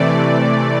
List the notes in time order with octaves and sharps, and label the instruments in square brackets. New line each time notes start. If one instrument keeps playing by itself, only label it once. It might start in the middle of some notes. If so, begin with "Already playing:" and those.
Already playing: [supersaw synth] C3 E3 A3 D5